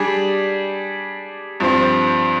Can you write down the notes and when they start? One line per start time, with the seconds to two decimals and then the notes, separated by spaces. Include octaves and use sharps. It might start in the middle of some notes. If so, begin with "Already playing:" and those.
Already playing: G3 D4 G#4
1.60 G2 F3 C4